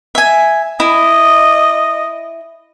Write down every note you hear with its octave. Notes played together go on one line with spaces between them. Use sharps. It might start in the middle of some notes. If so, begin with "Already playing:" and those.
E5 G#5
E4 D#5